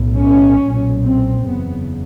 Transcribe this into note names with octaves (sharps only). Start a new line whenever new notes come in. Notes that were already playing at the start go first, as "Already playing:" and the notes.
Already playing: B1 A2
C#4
B1 A#2
C4
F#1 E2 C#3 B3